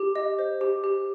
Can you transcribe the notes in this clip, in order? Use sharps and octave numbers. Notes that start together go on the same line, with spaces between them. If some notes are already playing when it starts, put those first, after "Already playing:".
Already playing: G4
D#5
C5
G4
G4